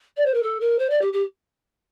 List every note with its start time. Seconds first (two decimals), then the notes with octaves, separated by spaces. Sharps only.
0.17 D5
0.25 C5
0.34 A#4
0.43 A4
0.60 A#4
0.79 C5
0.90 D5
1.01 G4
1.13 G4